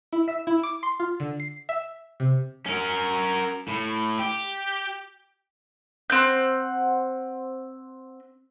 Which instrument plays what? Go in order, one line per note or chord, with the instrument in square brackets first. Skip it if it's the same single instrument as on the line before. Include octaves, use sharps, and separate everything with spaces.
[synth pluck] E4
E5
E4
D6
C6
F4
D3
C7
E5
C3
[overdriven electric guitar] C#4 A#4
A2
G4
[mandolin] C4 F#5 G6